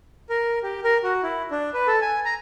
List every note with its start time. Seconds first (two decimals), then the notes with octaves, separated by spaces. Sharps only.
0.30 A#4
0.63 G4
0.84 A#4
1.04 F#4
1.23 E4
1.51 D4
1.74 B4
1.87 A4
2.01 G#5
2.25 A#5